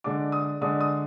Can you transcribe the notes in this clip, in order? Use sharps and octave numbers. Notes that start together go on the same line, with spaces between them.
D3 G#3 D4 D6
D#6
D3 G#3 D4 D#6
D#6